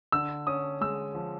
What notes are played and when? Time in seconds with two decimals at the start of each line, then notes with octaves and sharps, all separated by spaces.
0.12 D3 E6
0.47 C#4 D#6
0.81 G#3 E6
1.15 F3